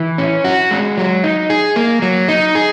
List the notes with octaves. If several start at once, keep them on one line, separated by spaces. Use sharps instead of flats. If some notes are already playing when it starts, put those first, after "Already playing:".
Already playing: E3
C#4
F#4
G#3
F#3
D#4
G#4
A#3
F#3
D#4
G#4